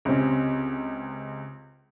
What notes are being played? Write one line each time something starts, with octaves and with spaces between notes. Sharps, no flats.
C#2 C3 C4 C#4